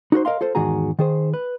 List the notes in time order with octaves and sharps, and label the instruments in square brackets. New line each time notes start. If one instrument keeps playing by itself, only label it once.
[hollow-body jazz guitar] D#4 F#4 A#4 C5
A#4 D#5 F5 C6
F4 A4 C5
E2 G#2 D#3 F#4 G#4 A#5
D#3 G#4 C5
B4